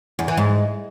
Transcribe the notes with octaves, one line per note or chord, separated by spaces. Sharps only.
E2
E3
G#2